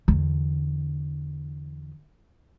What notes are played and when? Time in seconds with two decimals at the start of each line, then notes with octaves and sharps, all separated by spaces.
0.08 E2 D3